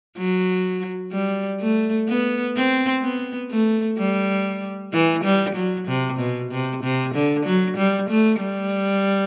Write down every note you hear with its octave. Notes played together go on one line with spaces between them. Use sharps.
F#3
G3
A3
B3
C4
B3
A3
G3
E3
G3
F#3
C3
B2
C3
C3
D3
F#3
G3
A3
G3